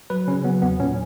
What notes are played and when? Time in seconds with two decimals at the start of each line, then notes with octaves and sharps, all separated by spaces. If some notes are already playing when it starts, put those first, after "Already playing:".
0.10 F#3 B4
0.28 C#3 C#4
0.44 F#3 B3
0.62 E2 B3
0.80 A#2 C#4